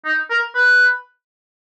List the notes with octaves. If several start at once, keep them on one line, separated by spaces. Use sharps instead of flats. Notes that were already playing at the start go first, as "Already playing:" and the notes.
D#4
A#4
B4